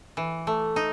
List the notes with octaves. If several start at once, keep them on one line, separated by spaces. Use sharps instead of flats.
E3
A3
D#4